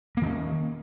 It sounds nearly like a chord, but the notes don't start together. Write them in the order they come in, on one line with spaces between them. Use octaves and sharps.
A#3 D#3 C#4